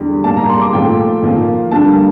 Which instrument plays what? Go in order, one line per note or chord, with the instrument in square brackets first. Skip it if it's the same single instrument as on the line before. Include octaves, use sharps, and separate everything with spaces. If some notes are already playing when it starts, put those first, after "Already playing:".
Already playing: [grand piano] E2 D3 G3
A#2 G3 A#3 A5
A#5
C6
D6
A#2 F3 A3 G5
A#2 F3 A#3
G2 D3 G3 A#3 A5